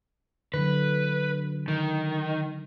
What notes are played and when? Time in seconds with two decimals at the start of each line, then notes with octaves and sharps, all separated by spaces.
0.54 D3 F#3 B4
1.68 D#3